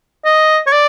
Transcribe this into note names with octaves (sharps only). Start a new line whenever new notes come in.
D#5
C#5
D5